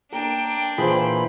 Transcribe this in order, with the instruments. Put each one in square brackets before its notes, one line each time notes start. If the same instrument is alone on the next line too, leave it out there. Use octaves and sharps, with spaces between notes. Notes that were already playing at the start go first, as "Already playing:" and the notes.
[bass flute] A#3 [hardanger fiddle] D4 G5 [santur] A#4
[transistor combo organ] A#2 E3 B5 [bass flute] F4 [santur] G#4 C5